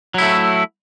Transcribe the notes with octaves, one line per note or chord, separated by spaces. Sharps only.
F#3 A3 E4